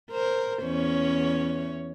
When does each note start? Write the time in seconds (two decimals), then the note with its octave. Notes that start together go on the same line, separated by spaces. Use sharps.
0.11 A#4 C5
0.62 E2 C#4 C#5